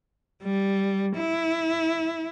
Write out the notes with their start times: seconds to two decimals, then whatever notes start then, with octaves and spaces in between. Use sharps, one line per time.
0.44 G3
1.17 E4